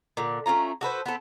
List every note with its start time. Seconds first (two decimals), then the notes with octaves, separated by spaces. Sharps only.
0.17 A#2 D3
0.46 A3 C#4 F4 A#5
0.81 F#4 A4 B4 C5
1.06 B3 C4 A4